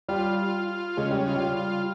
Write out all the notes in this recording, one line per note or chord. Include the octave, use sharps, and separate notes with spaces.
G3 F4
F4
F4
C#3 G#3
G3
F4
G3
F4